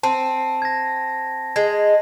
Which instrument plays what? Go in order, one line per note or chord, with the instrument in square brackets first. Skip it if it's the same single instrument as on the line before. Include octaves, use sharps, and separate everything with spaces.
[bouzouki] C4 [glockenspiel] A5
[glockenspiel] G#6 A#6
[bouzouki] G#3 [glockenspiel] G#6